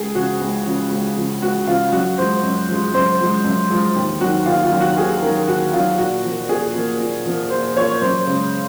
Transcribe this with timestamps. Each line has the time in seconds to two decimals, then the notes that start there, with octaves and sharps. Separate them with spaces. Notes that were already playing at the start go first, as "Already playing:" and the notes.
Already playing: C#2 G#4
0.15 C#3 F3 F#4
0.41 C#2
0.66 C#3 F3
0.91 C#2
1.16 C#3 F3
1.42 C#2 F#4
1.67 C#3 F3 F4
1.92 F#2 F#4
2.18 F3 G#3 C5
2.43 F#2
2.69 F3 G#3
2.94 F#2 C5
3.20 F3 G#3
3.44 F#2
3.70 F3 G#3
3.96 D#2
4.21 D#3 F#3 F#4
4.46 D#2 F4
4.63 F4
4.72 D#3 F#3
4.80 F#4
4.97 D#2 G#4
5.22 D#3 F#3 A#4
5.47 D#2 F#4
5.73 D#3 F#3 F4
5.98 A#2 F#4
6.24 F3 A#3
6.49 A#2 G#4
6.75 F3 A#3
7.00 A#2
7.26 F3 A#3
7.50 A#2 C5
7.76 F3 A#3 C#5
8.01 F#2 C5
8.26 C#3 G#3